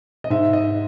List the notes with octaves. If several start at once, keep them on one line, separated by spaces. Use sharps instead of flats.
D#5
G#2 E5
D#5